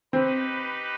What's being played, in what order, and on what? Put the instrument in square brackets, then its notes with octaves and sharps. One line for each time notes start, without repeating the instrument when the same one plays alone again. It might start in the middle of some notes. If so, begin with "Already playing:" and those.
[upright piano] C4 [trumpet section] D#4 G4 B4